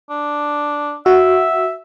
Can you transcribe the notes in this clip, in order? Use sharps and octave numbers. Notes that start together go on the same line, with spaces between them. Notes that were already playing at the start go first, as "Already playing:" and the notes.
D4
F#4 E5